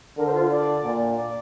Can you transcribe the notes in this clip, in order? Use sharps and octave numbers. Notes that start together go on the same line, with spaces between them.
D3 A#4
C5
F4
D5
A#2
D5